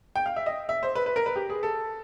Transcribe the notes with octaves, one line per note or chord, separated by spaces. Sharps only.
G5
F5
E5
D#5
E5
C5
B4
B4
A#4
B4
G4
G#4
A4